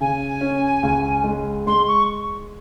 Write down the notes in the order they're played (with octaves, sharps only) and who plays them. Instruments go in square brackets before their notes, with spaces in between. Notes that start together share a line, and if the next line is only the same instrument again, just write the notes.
[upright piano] C#3 [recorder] G#5
[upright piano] C#4
C#2
G#3
[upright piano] G#3 [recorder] C6
[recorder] C#6